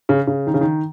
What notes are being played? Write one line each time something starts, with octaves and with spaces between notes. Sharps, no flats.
C#3
C#3
D#3
C#3
D#3